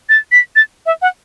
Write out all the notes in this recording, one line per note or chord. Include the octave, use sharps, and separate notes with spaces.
A6
B6
A6
E5
F#5